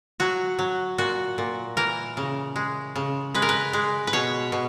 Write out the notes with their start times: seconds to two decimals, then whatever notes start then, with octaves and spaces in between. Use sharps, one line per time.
0.20 F#3 F#4
0.59 F#3
0.98 A#2 F#4
1.38 A#2
1.77 E3 A#4
2.17 C#3
2.56 G#3
2.96 C#3
3.34 G#3 B4
3.42 A#4
3.49 B4
3.73 G#3
4.07 B4
4.13 B2 C#5
4.52 B2